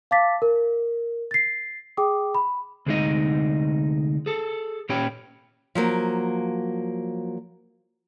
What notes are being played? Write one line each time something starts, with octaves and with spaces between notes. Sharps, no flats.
F5 A5 D6 A6 B6
A#4
A6 C7
G#4 G5 D6 D#6
B5
D2 C3 G#3 A#3 D#4 D#5
G#4 A4
A#2 C#4 G4 C#5 G5 B5
F3 F#3 A#3